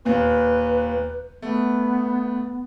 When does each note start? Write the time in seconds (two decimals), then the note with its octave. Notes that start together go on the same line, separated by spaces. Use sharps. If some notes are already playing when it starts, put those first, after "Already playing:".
0.05 D#2 A#2 B4
1.42 A3 B3